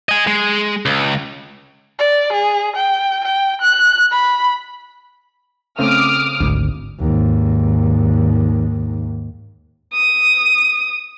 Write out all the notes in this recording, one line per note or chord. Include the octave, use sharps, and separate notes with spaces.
D#5 G#5
G#3
C#2
D5
G#4
G5
G5
F#6
B5
C#3 A3 C4 D6 D#6 F6
G#1 D2
D#2 G#2
D#6